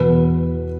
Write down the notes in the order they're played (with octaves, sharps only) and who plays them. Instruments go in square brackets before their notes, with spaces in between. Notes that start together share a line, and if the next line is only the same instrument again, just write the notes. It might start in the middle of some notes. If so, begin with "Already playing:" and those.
Already playing: [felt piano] E2 B2 B3 B4